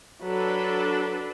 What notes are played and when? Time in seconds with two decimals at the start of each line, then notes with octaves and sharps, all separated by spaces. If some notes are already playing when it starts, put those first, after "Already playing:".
0.24 F#3 D4 A4 B4